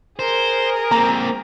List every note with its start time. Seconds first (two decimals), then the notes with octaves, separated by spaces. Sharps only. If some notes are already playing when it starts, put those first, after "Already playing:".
0.19 G#4 A#4 C5
0.92 A#3 C4 A#5